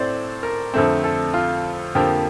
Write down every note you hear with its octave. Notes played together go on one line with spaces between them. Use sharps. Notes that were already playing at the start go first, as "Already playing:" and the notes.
Already playing: A2 A3 C4 C5 D5
A#4
F2 D3 A3 C4
A4
F4
F2 D3 F3 A#3 G4